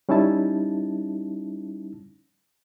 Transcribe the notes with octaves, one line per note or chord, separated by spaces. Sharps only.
G3 C#4 D#4 E4 A5